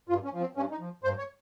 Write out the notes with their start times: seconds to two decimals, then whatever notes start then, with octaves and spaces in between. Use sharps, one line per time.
0.09 G2 F4
0.25 C#4
0.33 F3
0.40 C4
0.55 G2 C#4
0.71 D#4
0.79 F3
1.04 G2 C5
1.18 C#5